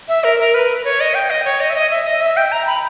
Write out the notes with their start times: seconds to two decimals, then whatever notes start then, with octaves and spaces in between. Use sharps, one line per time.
0.09 E5
0.24 A#4
0.39 A#4
0.55 B4
0.85 C#5
1.00 D#5
1.15 G5
1.30 D#5
1.45 C#5
1.60 D#5
1.70 E5
1.75 D#5
1.91 E5
2.07 D#5
2.21 E5
2.37 G5
2.52 A#5
2.67 B5